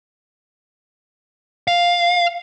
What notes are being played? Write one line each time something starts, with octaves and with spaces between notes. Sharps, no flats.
F5